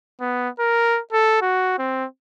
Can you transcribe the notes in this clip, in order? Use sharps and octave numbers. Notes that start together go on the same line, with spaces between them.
B3
A#4
A4
F#4
C4